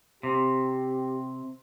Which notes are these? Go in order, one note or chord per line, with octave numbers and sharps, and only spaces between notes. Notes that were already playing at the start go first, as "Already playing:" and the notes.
C3 G4